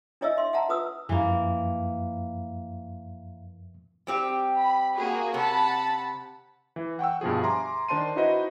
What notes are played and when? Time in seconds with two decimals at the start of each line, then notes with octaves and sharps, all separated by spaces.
0.21 D4 E4 C#5 D#5 E5 E6
0.37 E5 C6
0.53 E5 F#5 A5 A#5
0.69 F4 B4 D#6 E6
1.09 F#2 E3 F3 A#3
4.07 G3 C4 G4
4.57 B5
4.97 A#3 F#4 G#4
5.34 C3 F#5 A5 B5
6.76 E3
6.99 F#5 G5 C#6 E6
7.21 G2 B2 F3 G#4
7.42 E5 G#5 A#5 C6 D6
7.89 D#3 D4 C5 A5 C6 D#7
8.16 D#4 E4 F#4 B4 C5 D#5